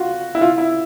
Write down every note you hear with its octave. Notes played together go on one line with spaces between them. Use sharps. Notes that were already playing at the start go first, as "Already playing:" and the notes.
Already playing: F4 F#4
E4
F4
E4